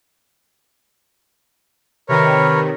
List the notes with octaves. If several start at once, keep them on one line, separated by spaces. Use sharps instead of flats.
C3 D#3 A#4 B4 C#5